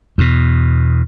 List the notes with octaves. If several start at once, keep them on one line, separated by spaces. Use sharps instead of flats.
E2 B2